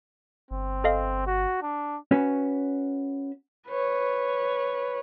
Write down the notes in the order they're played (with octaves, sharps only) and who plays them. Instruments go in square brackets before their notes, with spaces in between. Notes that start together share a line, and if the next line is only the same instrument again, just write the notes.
[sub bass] G1 [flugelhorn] C4
[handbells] A4 D#5 F5
[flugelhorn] F#4
D4
[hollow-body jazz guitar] C#4 F#4 B4
[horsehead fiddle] B4 C#5